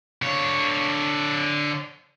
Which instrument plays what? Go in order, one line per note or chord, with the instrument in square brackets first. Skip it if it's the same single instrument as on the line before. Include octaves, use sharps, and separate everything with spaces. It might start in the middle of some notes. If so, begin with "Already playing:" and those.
[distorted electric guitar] D3 C#5